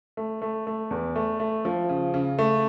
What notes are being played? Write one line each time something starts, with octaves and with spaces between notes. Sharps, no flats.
A3
A3
A3
E2
A3
A3
F3
C#3
C#3
A3